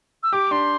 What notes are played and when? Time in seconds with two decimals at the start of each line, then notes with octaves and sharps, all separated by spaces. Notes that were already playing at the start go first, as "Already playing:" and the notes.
0.23 E6
0.33 G4 D6
0.51 D4 C6